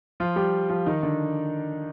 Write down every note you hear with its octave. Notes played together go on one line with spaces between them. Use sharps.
F3 F4
G3 G4
F3 F4
D#3 D#4
D3 D4